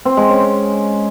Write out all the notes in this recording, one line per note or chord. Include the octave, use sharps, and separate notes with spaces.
C4
G#3
C#4